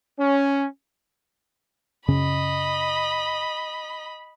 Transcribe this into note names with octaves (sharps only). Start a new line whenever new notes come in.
C#4
F#2 C#3 C#4 D#5 B5